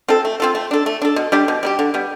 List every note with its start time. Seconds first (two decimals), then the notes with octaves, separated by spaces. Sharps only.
0.08 C4 F4 A4
0.25 A3
0.40 C4 F4 A4
0.55 A3
0.71 D4 A4
0.86 A3
1.02 D4 A4
1.16 B2
1.32 G3 D4 G4
1.48 B2
1.63 G3 D4 G4
1.79 D3
1.94 G3 B3